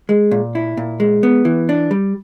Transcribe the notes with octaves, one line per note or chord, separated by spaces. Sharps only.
G#3
A#2
E4
A#2
G#3
B3
E3
D4
G3